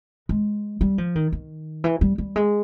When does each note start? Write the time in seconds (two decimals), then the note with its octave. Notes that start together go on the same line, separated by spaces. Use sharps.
0.29 G#3
0.81 G3
0.98 F3
1.15 D#3
1.32 D#3
1.84 E3
2.01 G3
2.18 G3
2.36 G#3